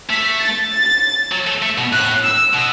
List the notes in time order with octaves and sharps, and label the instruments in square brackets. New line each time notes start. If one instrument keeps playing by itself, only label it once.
[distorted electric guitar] A3 [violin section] B6
[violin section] A6
A6
[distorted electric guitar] F#3
A3
A3
B2
[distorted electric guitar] A2 [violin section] F#6
[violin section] E6
[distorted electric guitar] B2